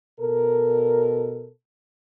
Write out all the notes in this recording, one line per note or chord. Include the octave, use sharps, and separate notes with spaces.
B2 A4 A#4